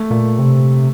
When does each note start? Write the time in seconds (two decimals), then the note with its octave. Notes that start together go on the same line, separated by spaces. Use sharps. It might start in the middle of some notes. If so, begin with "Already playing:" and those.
Already playing: A3
0.11 A#2
0.39 C3